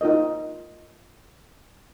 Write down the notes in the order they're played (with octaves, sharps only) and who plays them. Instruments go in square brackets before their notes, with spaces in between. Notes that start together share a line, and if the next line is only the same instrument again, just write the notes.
[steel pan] D#4 F4 A#4 D#5